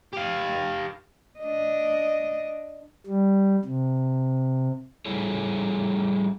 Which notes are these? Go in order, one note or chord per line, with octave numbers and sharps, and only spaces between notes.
G4 F5
D4 D#5
G3
C3
G3 E4 G#4 A4 C#5